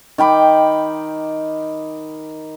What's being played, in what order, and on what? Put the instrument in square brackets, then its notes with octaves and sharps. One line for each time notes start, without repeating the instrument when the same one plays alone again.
[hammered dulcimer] D#3 G5 B5 D6